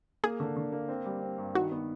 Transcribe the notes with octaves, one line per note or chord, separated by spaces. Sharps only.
A#3 G#4
D3
D3
A#3
C4
G3
C4
G2
D#3 F#4
B3